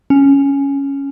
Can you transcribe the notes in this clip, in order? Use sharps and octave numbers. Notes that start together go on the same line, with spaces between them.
C#4